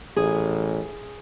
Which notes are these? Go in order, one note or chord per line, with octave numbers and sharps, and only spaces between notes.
A1 G#4